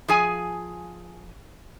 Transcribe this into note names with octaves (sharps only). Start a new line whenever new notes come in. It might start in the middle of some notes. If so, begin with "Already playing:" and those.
F3 G#4 G#5